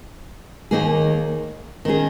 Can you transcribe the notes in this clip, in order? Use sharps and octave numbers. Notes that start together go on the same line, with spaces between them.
D#2 D#3 A#3 D#4 G#4
D#3 C#4 G#4